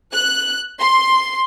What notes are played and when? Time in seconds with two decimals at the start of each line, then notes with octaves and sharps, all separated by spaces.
0.12 F#6
0.80 C6